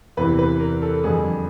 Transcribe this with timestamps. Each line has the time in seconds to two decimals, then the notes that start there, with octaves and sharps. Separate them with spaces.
0.17 E2 C3 E3 B4
0.39 B4
0.60 A#4
0.82 A4
1.04 F2 D3 G3 G#4